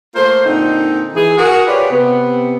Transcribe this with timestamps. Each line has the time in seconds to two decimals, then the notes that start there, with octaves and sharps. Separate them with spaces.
0.15 A3 A#3 F4 C5
0.46 A#2 D3 C4 D#4
1.15 E3 G#4
1.38 F#4 G#4 A#4
1.67 F4 G4 G#4 B4 C#5 D5
1.91 C3 B3